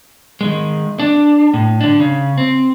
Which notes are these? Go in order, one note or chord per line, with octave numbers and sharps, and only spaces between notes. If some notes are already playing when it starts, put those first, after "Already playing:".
D#3 G#3
D4
A2
D3 D4
C#3
C4